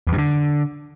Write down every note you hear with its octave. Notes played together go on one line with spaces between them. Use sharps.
E2
G2
D3